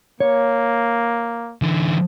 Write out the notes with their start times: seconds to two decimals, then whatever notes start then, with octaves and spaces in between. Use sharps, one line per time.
0.20 A#3 C#5
1.62 D3 E3